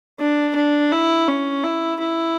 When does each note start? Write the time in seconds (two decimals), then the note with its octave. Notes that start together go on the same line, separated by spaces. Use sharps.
0.19 D4
0.56 D4
0.92 E4
1.28 C#4
1.63 E4
1.99 E4